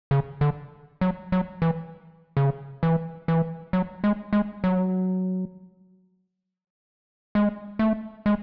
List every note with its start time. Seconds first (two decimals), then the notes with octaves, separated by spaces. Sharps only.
0.11 C#3
0.41 D3
1.01 F#3
1.32 F#3
1.62 E3
2.37 C#3
2.83 E3
3.28 E3
3.73 F#3
4.04 G#3
4.33 G#3
4.64 F#3
7.35 G#3
7.79 A3
8.26 G#3